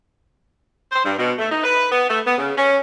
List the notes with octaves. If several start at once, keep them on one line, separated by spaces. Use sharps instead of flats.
C5
G2
B2
A3
D#4
B4
B3
A3
B3
C#3
C#4